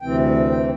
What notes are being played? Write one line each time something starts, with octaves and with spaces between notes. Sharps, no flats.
D2 C3 E3 C4 G5
G5